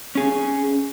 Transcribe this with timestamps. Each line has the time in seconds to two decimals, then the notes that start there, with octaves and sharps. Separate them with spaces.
0.15 C#4 G#4